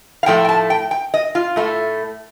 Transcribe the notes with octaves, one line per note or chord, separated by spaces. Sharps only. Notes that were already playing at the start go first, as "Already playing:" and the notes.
F5
A2 F3 A3 G5
G5
A5
G5
G5
D#5
F4
A2 A3